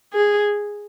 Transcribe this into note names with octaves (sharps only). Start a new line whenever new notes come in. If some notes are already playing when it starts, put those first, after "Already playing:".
G#4